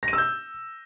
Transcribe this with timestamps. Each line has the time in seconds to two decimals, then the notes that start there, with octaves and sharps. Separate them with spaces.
0.03 A#6
0.08 D#7
0.13 E6
0.18 G6